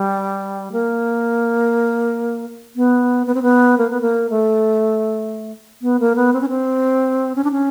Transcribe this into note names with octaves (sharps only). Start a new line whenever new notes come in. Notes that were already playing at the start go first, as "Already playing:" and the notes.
Already playing: G3
A#3
B3
B3
C4
B3
A#3
B3
A#3
A3
B3
A#3
B3
C4
C#4
C4
C#4
D4
C#4